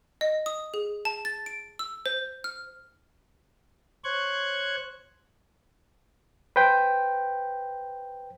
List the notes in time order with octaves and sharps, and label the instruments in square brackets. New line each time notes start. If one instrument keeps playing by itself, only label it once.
[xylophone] D#5
D#6
G#4
A5
A6
D7
E6
C5
F6
[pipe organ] C5 C#5 C#6 F#6 G#6
[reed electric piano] B4 C5 G5